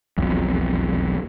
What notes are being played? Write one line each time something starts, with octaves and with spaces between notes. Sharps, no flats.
E1 B1 F2